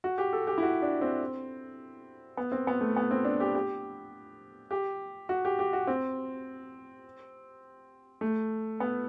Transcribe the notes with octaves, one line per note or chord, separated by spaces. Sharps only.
F#4
G4
A4
G4
E4
F#4
D4
C4
B3
C4
B3
A3
B3
C4
D4
G4
G4
G4
F#4
G4
G4
F#4
C4
A3
B3